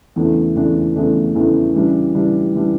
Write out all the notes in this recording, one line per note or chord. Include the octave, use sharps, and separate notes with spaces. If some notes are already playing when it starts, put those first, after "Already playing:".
E2 C#3 E3 A3 D4
E2 C#3 E3 A3 D4
E2 C#3 E3 A3 D4
E2 C#3 E3 A3 D4
C#3 E3 G3 D4
C#3 E3 G3 D4
C#3 E3 G3 D4